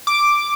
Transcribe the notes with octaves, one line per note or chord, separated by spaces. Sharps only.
D6